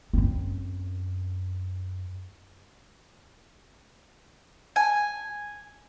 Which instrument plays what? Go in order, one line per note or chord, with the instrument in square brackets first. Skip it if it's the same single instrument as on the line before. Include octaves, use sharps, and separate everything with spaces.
[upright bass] F#2 C4
[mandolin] G#5